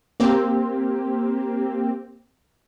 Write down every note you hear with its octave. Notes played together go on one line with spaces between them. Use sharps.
A#3 C4 G4